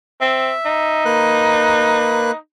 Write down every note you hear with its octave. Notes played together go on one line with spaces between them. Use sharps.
C4 E5
D#4
A#3 B4 F#6